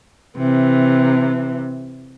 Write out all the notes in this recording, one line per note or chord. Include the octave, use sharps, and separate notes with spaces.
C3 E3